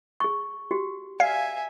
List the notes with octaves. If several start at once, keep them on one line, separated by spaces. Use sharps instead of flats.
G#4 C#6
F#4 G4
D5 E5 F5 G#5